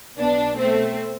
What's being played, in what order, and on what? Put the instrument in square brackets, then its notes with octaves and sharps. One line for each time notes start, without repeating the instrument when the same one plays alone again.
[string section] B1 B2 B3 D4
A3 C4